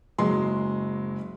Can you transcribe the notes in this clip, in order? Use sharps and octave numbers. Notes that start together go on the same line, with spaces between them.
F#1 F#3 G#3 C6